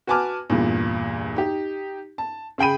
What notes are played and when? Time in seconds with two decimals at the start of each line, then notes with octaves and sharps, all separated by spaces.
0.07 F#4 B4 G#5 A5 D6 F6
0.50 E2 G2 A#2
1.36 D#4 G4
2.18 A5
2.58 C#3 G#4 G5 B5 D#7